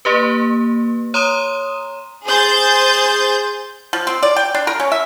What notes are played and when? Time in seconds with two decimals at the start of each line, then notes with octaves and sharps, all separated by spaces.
0.05 A#3 G4 B4
1.14 C#5 A#5 C6 D#6 D#7 E7
2.26 G#4 C5 G6 A6
3.93 F3
4.07 C4
4.23 D5
4.36 G5
4.55 D4
4.67 A#4
4.80 C#4
4.92 E5